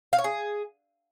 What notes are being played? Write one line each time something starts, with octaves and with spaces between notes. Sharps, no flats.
F5
C#5
G#4